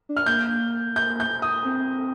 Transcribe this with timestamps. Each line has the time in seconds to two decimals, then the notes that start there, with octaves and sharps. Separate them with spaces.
0.09 D4
0.17 F6
0.26 A#3 G6
0.96 G6
1.20 G6
1.42 D#6
1.65 C4